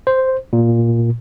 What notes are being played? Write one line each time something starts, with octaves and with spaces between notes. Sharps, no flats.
C5
A#2